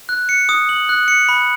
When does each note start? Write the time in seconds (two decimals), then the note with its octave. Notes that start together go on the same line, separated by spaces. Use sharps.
0.09 F#6
0.29 C#7
0.49 D#6
0.69 F#7
0.89 F#6
1.08 C#7
1.29 B5